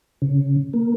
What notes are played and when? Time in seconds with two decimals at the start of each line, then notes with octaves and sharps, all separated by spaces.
0.22 C#3
0.73 A#3